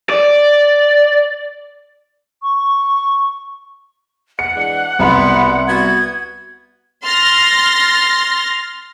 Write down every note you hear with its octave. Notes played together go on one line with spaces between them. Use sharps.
D5
C#6
F#5 C#7
E3 G#3 D4
C2 B2 B3 B5 C6
B3 F#4 G#6
C6 F6 A6 A#6